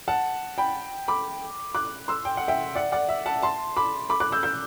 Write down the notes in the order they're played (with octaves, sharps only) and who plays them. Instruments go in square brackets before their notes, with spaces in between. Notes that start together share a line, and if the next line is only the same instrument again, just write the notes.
[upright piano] F#5 A5
G5 B5
B5 D6
D6 F#6
C6 E6
G5
F#5
E5 G5
D5 F#5
D5 F#5
E5
F#5 A5
A5 C6
B5 D6
B5 D6
D6 F#6
E6 G6
E6 G6